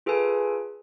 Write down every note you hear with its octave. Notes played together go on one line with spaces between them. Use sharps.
F4 G#4 A4 B4 G#5